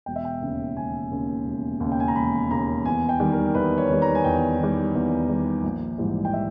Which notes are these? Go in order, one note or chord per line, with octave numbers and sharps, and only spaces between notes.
E1 G5
E5
G5
D#2 C#3
E1 G#5
D#2 C#3
E1
D#2
C#3
G5
G#5
A#5
E1 B5
D#2 C#3 A#5
E2 G#5
G5
D#3 G3
A#4
E2 B4
C#5
D#3 G3
A#5
G#5
E2 G5
D#3 G3
E2
D#3 G3
A#1
G#2 E3 G3
G5
E5